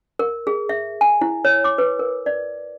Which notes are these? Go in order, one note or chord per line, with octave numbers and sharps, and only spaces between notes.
A#4
G#4
E5
G#5
E4
C#5
D6
B4
A#4
D5